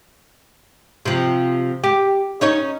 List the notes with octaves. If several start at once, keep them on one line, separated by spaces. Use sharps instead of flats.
C3 F3
G4
C#4 D#4 C#5